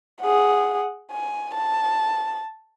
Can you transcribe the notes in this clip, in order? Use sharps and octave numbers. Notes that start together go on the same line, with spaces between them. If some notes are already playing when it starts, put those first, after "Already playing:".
G#4 F#5
G#5
A5